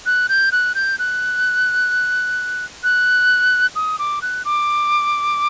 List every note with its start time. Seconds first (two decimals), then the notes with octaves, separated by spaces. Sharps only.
0.06 F#6
0.29 G6
0.52 F#6
0.75 G6
0.99 F#6
2.84 F#6
3.75 D#6
3.99 D6
4.22 F#6
4.45 D6